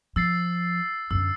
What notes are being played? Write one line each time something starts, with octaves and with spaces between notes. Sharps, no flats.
F3 E6 A6 C7
F#2 D3 E6